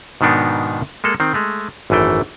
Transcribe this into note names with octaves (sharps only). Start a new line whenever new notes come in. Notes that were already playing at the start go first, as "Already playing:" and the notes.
G#2 B2 D#3 B3 D4 D#4
G#3 A#3 A4
D#3 C4
G#3 A3
G#1 F#2 E3 A3 G5